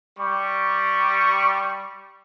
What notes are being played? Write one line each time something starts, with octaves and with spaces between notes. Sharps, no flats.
G3 C#6